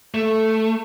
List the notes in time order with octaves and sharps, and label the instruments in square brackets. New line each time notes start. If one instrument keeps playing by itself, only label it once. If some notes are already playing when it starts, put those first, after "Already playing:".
[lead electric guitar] A3